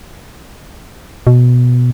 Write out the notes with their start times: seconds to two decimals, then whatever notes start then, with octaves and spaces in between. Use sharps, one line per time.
1.27 B2